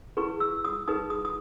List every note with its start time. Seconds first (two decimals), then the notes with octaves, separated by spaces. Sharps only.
0.17 E4 G#4 B4 C#6
0.40 E6
0.65 D#6
0.88 D#4 G#4 B4 D#6
1.10 D#6
1.25 D#6